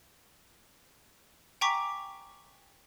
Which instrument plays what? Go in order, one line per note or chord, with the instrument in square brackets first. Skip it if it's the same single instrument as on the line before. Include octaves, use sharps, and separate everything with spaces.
[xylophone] G5 G#5 A#5 C#6 D6 B6